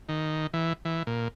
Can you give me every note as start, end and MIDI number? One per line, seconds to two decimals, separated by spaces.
0.09 0.47 51
0.53 0.73 52
0.85 1.03 52
1.07 1.28 46